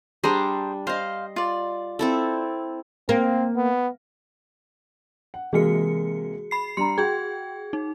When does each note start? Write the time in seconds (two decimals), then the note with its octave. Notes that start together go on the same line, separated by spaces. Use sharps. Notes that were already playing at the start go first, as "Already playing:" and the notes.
0.24 G3 D4 G#4 C5 A#5
0.87 C5 D#5 F5 C6
1.36 F4 D5
1.99 C4 E4 A4
3.09 A#3 C4
3.56 B3
5.34 F#5
5.53 C3 E3 G#3 A#3 F#4 G#4 C#7
6.51 B5 C7
6.77 G3 D4 A#5 C6 C#7
6.98 F#4 G#4 G5 G#6
7.73 D#4